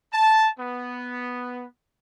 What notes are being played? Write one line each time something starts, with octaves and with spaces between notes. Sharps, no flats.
A5
B3